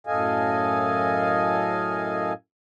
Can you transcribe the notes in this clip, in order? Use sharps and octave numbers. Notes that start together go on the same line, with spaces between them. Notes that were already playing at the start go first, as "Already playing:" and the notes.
F#2 A2 A4 D#5 F5 G#5